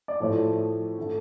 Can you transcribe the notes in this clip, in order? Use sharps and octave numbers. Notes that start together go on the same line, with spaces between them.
D5
A2 F3 A3 C#5
D3 A3